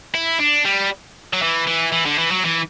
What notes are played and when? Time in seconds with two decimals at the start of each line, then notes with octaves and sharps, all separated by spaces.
0.15 E4
0.40 D4
0.65 G3
1.33 F#3
1.42 E3
1.67 E3
1.92 E3
2.06 D3
2.18 E3
2.31 F#3
2.45 E3